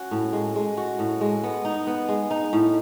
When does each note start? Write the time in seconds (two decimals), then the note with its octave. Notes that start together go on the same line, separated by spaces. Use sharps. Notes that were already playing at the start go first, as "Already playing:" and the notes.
Already playing: C#4 F#4
0.11 A2
0.33 G#3
0.55 G#3
0.77 F#4
0.99 A2
1.21 G#3
1.43 B3
1.65 D#4
1.87 B3
2.08 G#3
2.31 D#4
2.53 A2